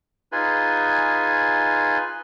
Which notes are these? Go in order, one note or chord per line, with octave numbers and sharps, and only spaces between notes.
D#4 F4 G#4 B4 G#5